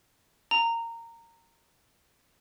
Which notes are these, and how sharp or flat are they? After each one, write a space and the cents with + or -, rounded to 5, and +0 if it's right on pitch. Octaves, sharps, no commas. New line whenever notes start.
A#5 -20